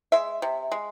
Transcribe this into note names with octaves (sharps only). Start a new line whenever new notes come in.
G#3 E5
C3
G#3